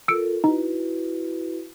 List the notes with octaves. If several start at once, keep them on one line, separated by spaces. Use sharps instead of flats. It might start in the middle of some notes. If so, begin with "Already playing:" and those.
F4 A4 A#4 E6 C#7 D7
D#4 E4 F#4 B4